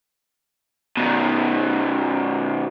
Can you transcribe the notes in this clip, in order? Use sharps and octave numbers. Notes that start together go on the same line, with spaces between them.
B2 D#3